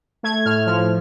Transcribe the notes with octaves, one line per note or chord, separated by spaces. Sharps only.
A3 G#6
A2 F6
F3 F6